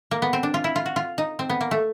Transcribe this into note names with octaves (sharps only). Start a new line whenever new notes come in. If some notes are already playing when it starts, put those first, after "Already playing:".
A#3
B3
C4
D4
F4
E4
F4
F#4
F4
D#4
C4
B3
A#3
A3